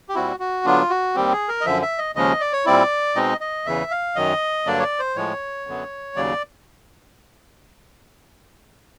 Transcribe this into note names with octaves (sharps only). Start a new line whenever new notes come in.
G4
A#2 G3 C4 E4 F#4
F#4
D3 F#3 B3 D4 F4
F#4
D#2 D#3 G3 C4 G4
G#4
A#4
D#5
F#2 D3 F3 E5
E5
D#5
D#2 C#3 F3 G#3 C#4 D#5
D5
C#5
A#2 G3 C4 E4 D5
B2 G#3 C4 D#4 D#5
D#5
E2 C#3 E3 E5
F5
F#2 D#3 F#3 D#5
G2 D3 F#3 A#3 D4 D5
C#5
D5
C5
A2 F3 G#3 C#5
F#2 D3 F#3 B3
D#2 C#3 F#3 D5